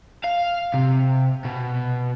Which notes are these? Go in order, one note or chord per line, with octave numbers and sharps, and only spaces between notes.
F5
C3
B2